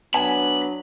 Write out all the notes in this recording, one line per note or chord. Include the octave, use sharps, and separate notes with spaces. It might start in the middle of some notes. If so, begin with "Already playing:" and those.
F#3 B3 D4 G#5 B5